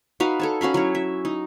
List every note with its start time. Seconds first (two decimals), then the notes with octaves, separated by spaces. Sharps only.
0.20 D#4 F#4 B4 F5
0.40 A4 C#5 A5
0.61 C#4 F#4 F5 B5
0.74 F#3 E4 C#5
0.95 E5
1.25 D#4